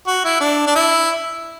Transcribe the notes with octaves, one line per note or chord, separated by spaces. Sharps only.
F#4
E4
D4
D4
E4